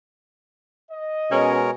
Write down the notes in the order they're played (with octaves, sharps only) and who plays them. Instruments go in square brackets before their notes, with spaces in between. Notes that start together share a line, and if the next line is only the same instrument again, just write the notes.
[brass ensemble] D#5
[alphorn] B2 [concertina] G#3 A#4 C#5 [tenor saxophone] C#4